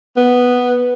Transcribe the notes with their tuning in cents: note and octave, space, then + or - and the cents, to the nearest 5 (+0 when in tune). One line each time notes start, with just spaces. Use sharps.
B3 +0